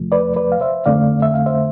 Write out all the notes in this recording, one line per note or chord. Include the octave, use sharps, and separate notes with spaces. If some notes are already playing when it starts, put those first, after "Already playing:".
Already playing: E2 C3 F3 A3
B4 D5
B4 D5
F5
C5 E5
F2 D3 A3 C4 D5 F5
E5
F5
C5 E5